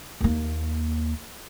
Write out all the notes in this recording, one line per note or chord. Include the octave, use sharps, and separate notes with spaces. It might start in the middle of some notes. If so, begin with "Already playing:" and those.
D#2 A#3